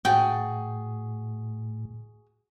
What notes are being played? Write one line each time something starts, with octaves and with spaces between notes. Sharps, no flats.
A2 F#4 G#4 G5 A5